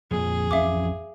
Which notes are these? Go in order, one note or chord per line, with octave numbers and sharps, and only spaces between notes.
F2 A#2 G#4
A1 F2 C#4 E5 F5 D6